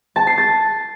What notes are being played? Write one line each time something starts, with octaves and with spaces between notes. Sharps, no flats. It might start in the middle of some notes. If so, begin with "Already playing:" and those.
A5
C7
A6